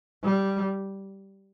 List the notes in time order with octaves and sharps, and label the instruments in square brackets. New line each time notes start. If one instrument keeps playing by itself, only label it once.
[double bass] G3